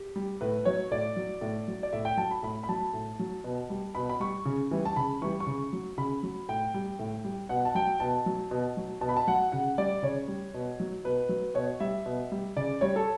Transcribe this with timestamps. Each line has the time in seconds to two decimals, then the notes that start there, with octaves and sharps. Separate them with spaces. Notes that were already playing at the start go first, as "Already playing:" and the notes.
Already playing: G4
0.16 G3
0.41 A2 B4
0.65 F#3 C#5
0.91 A2 D5
1.16 F#3
1.41 A2
1.68 F#3
1.83 D5
1.93 A2 E5
2.05 G5
2.17 F#3 A5
2.31 B5
2.43 A2 B5
2.63 B5
2.69 F#3 A5
2.93 A2
3.19 F#3
3.44 B2
3.70 G3
3.95 B2 B5
4.09 B5
4.20 G3 C#6
4.45 C#3
4.71 E3 G3
4.85 A5
4.96 C#3 B5
5.22 E3 G3 C#6
5.40 C#6
5.47 C#3
5.73 F#3
5.98 C#3 B5
6.23 F#3
6.49 A2 G5
6.74 G3
6.99 A2
7.24 G3
7.49 B2 F#5
7.65 A5
7.75 F#3 G5
8.00 B2 A5
8.26 F#3
8.51 B2
8.77 F#3
9.01 B2 A5
9.09 B5
9.17 A5
9.27 F#3 F#5
9.52 C#3 F#5
9.78 G3 D5
10.02 C#3 C#5
10.28 G3
10.54 B2
10.80 F#3
11.04 B2 B4
11.29 F#3
11.55 B2 C#5
11.80 G3 E5
12.06 B2
12.32 G3
12.56 C#3 D5
12.81 G3 C#5
12.96 A4